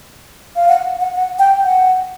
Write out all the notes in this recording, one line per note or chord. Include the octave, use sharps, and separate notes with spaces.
F5
F#5
F#5
F#5
G5
F#5